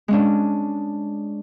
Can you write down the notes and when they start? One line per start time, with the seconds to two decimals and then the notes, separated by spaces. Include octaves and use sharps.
0.08 G#3 C#4 D4